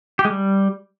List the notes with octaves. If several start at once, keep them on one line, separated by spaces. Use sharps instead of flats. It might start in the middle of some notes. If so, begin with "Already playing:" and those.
G4
G#3
G3